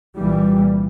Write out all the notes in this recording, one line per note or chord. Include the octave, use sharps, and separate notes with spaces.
C2 A#2 E3 G3